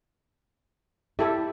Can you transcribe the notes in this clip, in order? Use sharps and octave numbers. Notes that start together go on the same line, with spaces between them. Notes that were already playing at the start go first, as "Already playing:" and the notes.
E4 G4 A4 E5